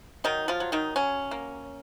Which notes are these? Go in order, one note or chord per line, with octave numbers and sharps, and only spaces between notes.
D#3 F#3 D#4
F3 F4
F#3
D#3 D#4
F#3 C#4
A#3